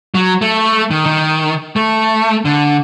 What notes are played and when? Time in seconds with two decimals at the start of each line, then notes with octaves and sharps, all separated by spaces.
0.14 F#3
0.42 A3
0.91 D#3
1.06 D#3
1.76 A3
2.45 D3